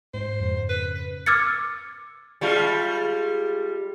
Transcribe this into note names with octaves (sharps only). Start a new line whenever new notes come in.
G#2 C5
F2 G#2 C#3
B4
B4 B6
D6 E6 F6 G#6 A6 C#7
G3 G#3 F4